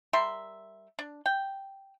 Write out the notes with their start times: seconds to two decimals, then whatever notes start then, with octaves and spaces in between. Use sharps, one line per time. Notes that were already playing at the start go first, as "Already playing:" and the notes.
0.13 G3 A#4 E5 C6
0.99 D4
1.26 G5